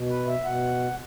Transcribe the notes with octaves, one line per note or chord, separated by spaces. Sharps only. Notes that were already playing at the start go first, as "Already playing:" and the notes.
Already playing: B2
B4
E5
B2 F#5